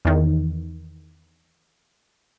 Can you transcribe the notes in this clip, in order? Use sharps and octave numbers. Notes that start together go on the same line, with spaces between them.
E2 D#3